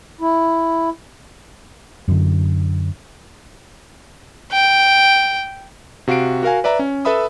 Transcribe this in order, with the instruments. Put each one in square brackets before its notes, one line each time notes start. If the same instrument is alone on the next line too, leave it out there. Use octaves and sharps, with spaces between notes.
[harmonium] E4
[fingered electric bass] F#2 D3
[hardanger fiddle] G5
[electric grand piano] C3 F#4 F5 C7 D7
F#4 A#4 F5 G#5
B4 D5 E5 A#5
C#4
A4 B4 E5 B5 D#6